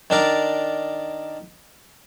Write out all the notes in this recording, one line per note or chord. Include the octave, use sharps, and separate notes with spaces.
D#3 D4 A#4 D5